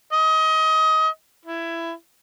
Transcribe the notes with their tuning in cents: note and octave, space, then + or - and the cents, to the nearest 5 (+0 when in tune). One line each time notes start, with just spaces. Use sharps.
D#5 +25
E4 +15